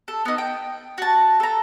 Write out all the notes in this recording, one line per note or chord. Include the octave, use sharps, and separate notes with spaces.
A4
B3 D#4
G5
F#4 A5
A4 A#5